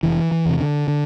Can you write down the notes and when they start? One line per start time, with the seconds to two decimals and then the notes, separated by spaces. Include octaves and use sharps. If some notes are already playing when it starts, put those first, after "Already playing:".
0.03 F1 E3
0.31 E3
0.45 E2 C3
0.60 D3
0.88 D3